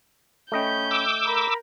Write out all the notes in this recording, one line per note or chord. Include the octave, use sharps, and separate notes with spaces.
A3 C#4 D#5 G5 B5 G6
D6 E6
A#4 A#5 B5